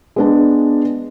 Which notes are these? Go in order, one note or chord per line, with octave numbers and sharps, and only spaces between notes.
G#3 B3 D4